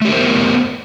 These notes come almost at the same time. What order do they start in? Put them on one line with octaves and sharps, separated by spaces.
A3 G4 A#4 C5 B3